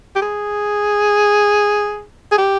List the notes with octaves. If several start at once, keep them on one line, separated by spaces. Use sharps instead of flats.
G4
G#4
G#4
G4